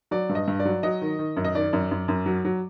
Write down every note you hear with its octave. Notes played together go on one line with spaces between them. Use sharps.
F#3 D5
G2
D#5
G2
D5
F#3
F#3 D#5
D#3
D#3
F#2
D#5
D#3 D5
F#2
F#2
F#2
F#3
F#3